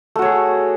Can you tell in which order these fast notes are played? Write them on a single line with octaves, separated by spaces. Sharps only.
A3 F#4 C#5 G#4